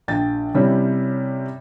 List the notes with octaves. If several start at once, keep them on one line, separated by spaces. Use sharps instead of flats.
A#1 G5 A6
C3 G3 C#4 E4